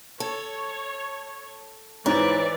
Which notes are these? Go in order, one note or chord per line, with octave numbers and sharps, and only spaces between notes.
A4 C#5
G#2 E3 C#5 D5